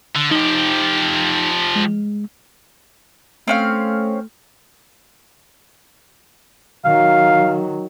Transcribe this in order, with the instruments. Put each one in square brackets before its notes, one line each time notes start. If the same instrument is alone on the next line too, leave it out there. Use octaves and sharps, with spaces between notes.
[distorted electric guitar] D3
[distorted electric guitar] F3 G4 [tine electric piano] D#4
[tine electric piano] G#3
[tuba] A3 [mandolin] C4 C#4 F5
[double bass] D#3 F#3 [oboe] F5